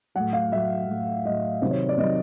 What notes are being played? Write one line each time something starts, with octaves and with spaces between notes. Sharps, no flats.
A2 F#3 F#5
F5
A2 F#3 E5
A2 F#3
A2 F#3 D#5
C3 D#3 F#3 C5
C#5
D5
C3 D#3 F#3 D#5